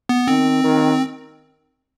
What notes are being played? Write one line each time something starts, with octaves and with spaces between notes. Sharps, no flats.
B3
D#3 C4
D#3